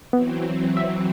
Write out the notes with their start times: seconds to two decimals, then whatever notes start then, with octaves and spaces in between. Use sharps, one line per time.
0.13 E3 F#3 B3 C4
0.77 E5